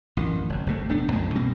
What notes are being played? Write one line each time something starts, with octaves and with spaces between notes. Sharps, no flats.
A1 F#2 D#3
F#1 F#2
F1 C3 A3
E1 A3 B3 D4
C2 F#2 A#2 D3
B2 G3 A#3 C4